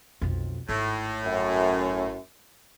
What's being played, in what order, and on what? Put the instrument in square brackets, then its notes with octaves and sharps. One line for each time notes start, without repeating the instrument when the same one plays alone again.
[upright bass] B1 F2
[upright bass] G#1 [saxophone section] A2
[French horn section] F#2